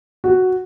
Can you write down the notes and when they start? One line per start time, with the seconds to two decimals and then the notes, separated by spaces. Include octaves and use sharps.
0.24 F#4